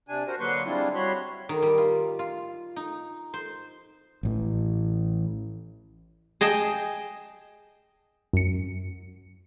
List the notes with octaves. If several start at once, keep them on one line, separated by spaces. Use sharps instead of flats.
C3 D4 G#5
F#4 A#4 C5
D3 F#3 A#3 B4 C6 C#6
G3 G#3 C4 D4 E4 F4
G3 F#4 C#5 B5 C6
D#3
G3
F4
F4
D#4
C5
A1 A2 E3
G#4 D#5 G5 A5
F#2 C#7